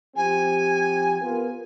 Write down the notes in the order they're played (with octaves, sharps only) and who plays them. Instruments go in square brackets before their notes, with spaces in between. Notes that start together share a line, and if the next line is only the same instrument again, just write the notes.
[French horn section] F3 C4 G4 [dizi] G#5
[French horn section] B3 F4 A#4